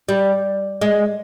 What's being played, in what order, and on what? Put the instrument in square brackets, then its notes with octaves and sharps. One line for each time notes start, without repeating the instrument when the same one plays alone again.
[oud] G3
G#3